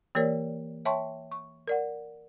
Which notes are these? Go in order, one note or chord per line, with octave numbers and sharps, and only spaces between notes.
E3 A#3 G4 A#4 C#5 D5
C#5 E5 G5 A5 C6 C#6
C#6
A#4 D5 F#5